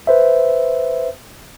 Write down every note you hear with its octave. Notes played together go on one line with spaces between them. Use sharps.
B4 C5 E5